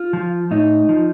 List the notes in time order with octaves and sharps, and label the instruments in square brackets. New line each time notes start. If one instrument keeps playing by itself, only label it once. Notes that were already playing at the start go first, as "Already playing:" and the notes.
Already playing: [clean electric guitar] F4
F3
A2 D#4
F3